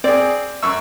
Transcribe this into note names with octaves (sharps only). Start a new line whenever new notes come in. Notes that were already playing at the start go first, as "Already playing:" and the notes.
C4 G#4 D5
F#2 C#6 E6